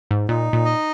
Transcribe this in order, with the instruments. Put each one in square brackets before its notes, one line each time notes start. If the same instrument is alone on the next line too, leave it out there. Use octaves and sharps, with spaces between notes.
[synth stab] G#2
[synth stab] A#2 [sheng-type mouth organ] D#4
[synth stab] A#2
[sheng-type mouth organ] D#5